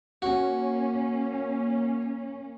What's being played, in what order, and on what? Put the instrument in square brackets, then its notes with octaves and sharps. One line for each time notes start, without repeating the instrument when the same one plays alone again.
[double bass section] A#3 C#4 [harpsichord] F#4